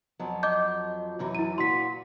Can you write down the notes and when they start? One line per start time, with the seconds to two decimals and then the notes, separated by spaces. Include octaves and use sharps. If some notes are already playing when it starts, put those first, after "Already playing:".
0.19 F2 F3 F#3
0.43 D#5 D6 G6
1.19 F#2 E3 F#3
1.35 E4 D#7
1.58 A#2 F#4 C6 B6